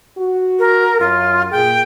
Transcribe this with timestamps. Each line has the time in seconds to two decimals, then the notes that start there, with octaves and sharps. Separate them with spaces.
0.18 F#4
0.59 A#4
1.00 F#2 F4
1.51 A#2 G#4 G5